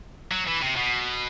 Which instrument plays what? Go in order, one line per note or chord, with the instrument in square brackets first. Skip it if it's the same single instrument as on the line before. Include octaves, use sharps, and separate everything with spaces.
[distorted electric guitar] F#3
E3
C3
B2